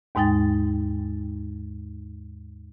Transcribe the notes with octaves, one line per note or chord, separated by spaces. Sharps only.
D#2 G#2 G#3 D#4 G5 A6